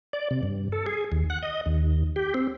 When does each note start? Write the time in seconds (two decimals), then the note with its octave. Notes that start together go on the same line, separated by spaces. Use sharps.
0.13 D5
0.31 C3
0.43 G2
0.72 A4
0.86 G#4
1.12 D#2
1.30 F#5
1.43 D#5
1.66 D#2
2.16 G4
2.34 C4